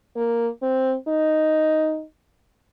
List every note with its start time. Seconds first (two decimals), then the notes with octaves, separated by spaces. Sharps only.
0.17 A#3
0.62 C4
1.08 D#4